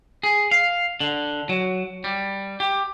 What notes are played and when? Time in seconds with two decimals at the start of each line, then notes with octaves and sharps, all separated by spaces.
0.23 G#4
0.51 F5
1.00 D3
1.49 F#3
2.04 G3
2.60 G4